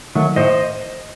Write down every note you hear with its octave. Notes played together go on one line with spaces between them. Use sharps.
D#3 F#3 A3
A2 C5 D#5